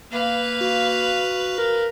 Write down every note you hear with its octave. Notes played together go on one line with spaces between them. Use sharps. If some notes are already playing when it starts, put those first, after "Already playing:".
A#3 B4 F5
F#4
A#4